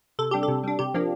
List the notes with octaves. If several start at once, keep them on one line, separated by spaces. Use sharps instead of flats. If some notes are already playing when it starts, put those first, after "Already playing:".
C3 A4
G3 D4 G4
A4
C3
G3 D4
C3 G4
F3 A#3 D4